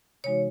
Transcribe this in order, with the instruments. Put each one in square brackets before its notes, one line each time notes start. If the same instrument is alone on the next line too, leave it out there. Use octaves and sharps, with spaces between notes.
[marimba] C3 E3 G#3 D#4 F#4 [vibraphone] C#5